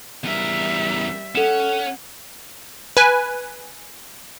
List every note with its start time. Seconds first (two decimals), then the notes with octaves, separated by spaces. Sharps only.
0.24 E2 G3 A#4 E5
1.35 C#4 A4 F#5 E7
2.97 B4 G#5